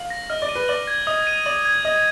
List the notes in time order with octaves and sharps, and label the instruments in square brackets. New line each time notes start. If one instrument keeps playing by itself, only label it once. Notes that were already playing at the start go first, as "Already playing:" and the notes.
Already playing: [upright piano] F5 [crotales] F#7
[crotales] A#6
[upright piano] D#5 [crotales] F6
[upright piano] D5
[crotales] D#7
[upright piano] B4
[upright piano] D5 [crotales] F#7
[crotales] G#6
[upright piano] D#5 [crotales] D#6
[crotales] D#7
[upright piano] D5 [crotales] F#7
[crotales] G#6
[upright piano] D#5 [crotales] D#6